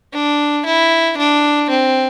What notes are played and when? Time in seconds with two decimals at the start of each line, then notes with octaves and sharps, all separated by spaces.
0.13 D4
0.65 E4
1.17 D4
1.70 C4